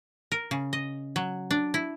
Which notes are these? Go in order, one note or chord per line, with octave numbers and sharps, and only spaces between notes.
A#4
C#3
D#5
F#3
D4
E4